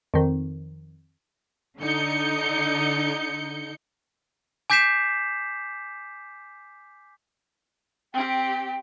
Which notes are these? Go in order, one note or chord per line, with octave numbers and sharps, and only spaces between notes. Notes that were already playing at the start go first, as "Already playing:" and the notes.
F2 D#3
D3 D#4 G6 C#7
G#5 D6 G6 B6 C7 E7
C4 G4 G5